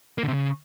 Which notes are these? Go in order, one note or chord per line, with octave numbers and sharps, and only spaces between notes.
A#3
D3
C3
C#3